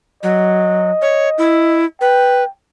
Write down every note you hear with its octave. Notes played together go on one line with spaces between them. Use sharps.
F#3 D#5
C#5
E4
B4 G5